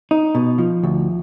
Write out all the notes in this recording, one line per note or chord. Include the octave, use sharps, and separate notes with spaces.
D#4
B2
F3
D2